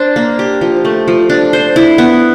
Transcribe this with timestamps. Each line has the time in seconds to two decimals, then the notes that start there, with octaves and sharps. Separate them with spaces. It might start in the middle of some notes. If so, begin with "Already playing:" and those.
Already playing: D4 C5
0.16 A#3
0.39 G4
0.61 F3
0.85 A3
1.08 F3
1.30 D4
1.53 C5
1.76 E4
1.98 B3